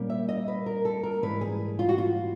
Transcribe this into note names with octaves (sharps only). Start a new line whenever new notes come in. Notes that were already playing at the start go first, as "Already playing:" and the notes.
Already playing: A#2 G3 A#3 C#4
E5
D#5
B4
A#4
A4
A#4
G#2 E3 G3 B4
G#4
F4
F#4
F4